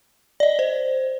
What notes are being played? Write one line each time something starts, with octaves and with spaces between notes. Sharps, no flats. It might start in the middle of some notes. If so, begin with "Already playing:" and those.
D5 D#5
C5